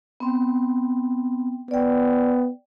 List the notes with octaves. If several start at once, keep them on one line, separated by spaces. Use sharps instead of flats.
B3 C4 G5
B3 D5 G5